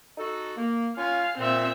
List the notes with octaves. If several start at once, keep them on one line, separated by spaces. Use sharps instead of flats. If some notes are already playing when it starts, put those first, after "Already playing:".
D#4 F#4 A4
A#3
C#4 F4 F5 G#5
A#2 C4 E5